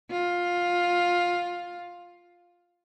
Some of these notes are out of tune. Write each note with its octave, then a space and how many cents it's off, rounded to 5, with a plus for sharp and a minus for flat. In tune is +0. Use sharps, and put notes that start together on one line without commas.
F4 +10